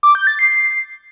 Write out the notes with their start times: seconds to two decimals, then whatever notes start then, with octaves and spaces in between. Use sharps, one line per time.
0.03 D6
0.15 G6
0.27 A6
0.39 C7